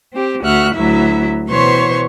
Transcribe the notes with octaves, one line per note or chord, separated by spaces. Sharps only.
C4 G4
D2 F#4 E5 F6 F#6
D2 F#3 E4 E5
B2 E3 C5 C#5 C6 C#6